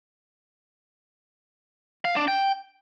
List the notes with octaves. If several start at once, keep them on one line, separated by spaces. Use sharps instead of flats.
F5
D4
G5